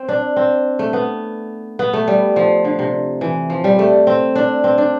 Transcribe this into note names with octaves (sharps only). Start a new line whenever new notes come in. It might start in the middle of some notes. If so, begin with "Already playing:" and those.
Already playing: C4
D4
C4
A3
B3
B3
A3
G3
F3
D3
C3
E3
F3
G3
A3
C4
D4
C4
D4